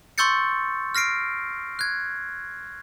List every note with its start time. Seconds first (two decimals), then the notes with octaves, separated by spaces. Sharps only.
0.18 C6 C#6 E6 G6 A6 C#7
0.95 F6 A#6 C7 D7
1.79 F#6 G#6